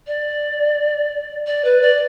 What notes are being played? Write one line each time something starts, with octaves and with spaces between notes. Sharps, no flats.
D5
D5
B4
D5